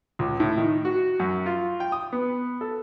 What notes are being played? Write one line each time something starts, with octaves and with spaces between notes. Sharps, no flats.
C#2
A2
D#3
F#4
F#2
F4
G5
D#6
B3
A4